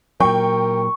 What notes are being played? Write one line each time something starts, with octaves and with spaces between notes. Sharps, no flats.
A#2 F#3 A#4 G5 C#6